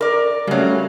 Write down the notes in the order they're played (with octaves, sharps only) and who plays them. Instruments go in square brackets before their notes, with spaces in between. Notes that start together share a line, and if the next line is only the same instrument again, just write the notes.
[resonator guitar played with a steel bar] A#4 D5
[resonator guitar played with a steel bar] C#3 F#3 [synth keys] G3 A3 C#4